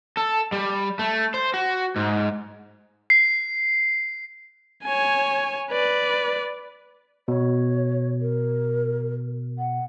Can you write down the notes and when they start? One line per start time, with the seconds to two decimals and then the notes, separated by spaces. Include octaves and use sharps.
0.17 A4
0.52 G3
0.99 A3
1.34 C5
1.54 F#4
1.96 G#2
3.10 C7
4.84 C#5 G#5
5.71 B4 D5
7.28 B2 C#5
8.21 A#4
9.58 F#5